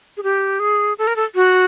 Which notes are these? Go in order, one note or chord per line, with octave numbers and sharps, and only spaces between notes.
G#4
G4
G#4
A4
A#4
A4
F#4